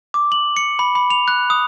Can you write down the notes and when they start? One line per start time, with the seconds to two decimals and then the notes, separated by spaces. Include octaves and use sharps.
0.14 D6
0.32 F#7
0.56 C#7
0.79 B5
0.95 B5
1.10 F7
1.28 F#6
1.50 D#6